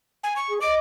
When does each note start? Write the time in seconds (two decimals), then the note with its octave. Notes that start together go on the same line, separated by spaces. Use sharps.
0.24 G#5
0.36 C#6
0.48 G#4
0.61 D#5 D6